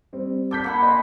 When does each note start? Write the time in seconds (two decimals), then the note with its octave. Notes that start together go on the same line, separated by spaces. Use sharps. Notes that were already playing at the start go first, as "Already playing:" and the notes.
0.13 G3 C4
0.51 A4 D6 G6 B6
0.64 A#3 F#5 B5
0.83 D#5 G#5 C6